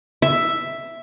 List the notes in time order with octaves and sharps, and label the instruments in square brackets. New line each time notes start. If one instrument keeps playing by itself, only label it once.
[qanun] E5